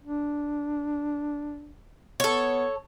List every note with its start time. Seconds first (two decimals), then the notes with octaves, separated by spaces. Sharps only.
0.01 D4
2.20 B3 A4 C#5